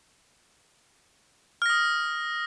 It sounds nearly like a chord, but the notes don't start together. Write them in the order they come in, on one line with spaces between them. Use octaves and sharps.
F6 A#6 D#6